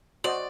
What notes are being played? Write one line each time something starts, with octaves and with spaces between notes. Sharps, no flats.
F#4 C5 D5 D#5